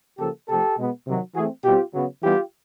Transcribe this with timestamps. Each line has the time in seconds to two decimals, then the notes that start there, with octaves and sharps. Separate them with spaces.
0.19 C#3 F3 A#3 G4 A4
0.48 C3 F3 A3 G4 A4
0.78 B2 G#3 B3
1.06 C3 D#3 F#3
1.35 E3 A3 C4 F#4 G#4
1.64 B2 G3 C4 F4 G4
1.94 C#3 F#3 B3
2.22 E3 G3 B3 F4 G4